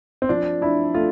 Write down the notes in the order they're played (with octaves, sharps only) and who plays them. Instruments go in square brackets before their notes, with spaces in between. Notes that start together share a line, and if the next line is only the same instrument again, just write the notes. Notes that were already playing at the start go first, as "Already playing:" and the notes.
[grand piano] C4
[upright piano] F3 [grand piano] D4
[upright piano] D4 [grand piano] E4
[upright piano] A3 [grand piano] F4